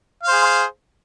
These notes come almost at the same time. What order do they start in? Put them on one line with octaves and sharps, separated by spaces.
F5 C5 G#4